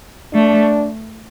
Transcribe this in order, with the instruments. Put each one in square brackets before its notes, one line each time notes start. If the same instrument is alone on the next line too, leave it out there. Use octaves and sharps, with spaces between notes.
[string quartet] A3 [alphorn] D4